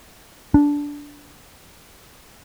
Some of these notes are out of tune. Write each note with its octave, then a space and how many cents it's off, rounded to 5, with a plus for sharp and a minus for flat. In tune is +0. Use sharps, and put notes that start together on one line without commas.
D4 -15